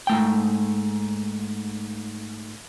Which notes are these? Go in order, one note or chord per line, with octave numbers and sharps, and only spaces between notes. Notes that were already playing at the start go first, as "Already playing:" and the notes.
G#2 A3 G5